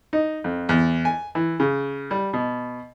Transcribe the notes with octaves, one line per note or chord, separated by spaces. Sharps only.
D#4
F2
E2
G#5
E3
C#3
G3
B2